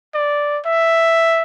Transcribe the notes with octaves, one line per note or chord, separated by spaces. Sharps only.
D5
E5